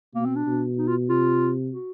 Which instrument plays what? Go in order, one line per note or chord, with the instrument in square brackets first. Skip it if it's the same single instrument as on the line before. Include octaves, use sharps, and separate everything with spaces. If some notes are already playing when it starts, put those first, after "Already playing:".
[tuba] B2 [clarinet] A#3
[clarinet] C4
D4
[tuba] B2
[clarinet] D#4
F4
[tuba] C3 [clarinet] F4
[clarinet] F#4